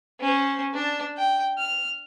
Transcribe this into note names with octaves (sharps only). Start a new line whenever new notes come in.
C#4 C5
D4 A5
G5
F6